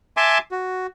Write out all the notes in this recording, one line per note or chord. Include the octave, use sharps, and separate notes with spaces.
E5 G#5 A5 C6 D6
F#4